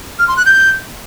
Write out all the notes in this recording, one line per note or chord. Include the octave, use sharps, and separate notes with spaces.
F6
C6
F#6
G6